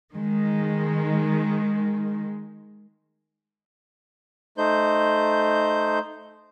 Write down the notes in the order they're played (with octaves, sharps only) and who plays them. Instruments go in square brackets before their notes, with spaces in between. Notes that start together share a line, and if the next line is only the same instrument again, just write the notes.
[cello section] D#3 G#3
[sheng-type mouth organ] A3 D#4 C5 G6